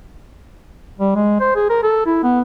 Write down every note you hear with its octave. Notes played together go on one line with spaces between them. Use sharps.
G3
G#3
C5
G#4
A#4
A4
E4
B3